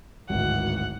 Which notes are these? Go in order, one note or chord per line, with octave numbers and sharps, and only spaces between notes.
D1 G#1 F#5